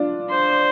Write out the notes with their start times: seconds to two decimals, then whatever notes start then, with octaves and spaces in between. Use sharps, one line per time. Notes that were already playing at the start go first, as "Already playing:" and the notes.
Already playing: D4 F4
0.30 C5